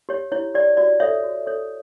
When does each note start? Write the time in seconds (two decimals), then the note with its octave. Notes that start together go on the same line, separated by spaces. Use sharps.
0.09 G4 C#5
0.32 E4 C#5
0.55 G4 C#5 D5
0.77 F#4 D5
1.00 A4 C#5 E5
1.23 F#4
1.46 A4 C#5